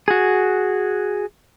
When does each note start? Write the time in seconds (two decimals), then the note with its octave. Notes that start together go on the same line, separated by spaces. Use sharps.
0.08 F#4 G#4